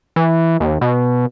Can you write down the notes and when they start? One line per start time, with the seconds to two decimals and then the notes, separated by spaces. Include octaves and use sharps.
0.16 E3
0.60 D#2
0.81 B2